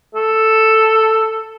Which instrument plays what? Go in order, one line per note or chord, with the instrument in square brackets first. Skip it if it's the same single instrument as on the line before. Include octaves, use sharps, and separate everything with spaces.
[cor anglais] A4